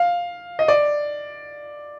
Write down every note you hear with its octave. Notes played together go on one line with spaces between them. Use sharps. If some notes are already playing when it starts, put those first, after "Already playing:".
Already playing: F5
D#5
D5